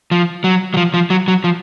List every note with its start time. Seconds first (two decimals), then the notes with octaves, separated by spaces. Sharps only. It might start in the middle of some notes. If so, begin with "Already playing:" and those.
0.11 F3
0.44 F#3
0.74 F#3
0.77 F3
0.94 F3
1.10 F#3
1.28 F#3
1.44 F3